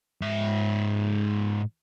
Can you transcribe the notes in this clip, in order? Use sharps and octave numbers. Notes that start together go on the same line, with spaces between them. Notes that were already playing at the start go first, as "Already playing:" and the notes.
G#2 E5